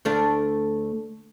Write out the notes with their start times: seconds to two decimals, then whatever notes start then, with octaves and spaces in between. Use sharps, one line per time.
0.05 D2 A3 D4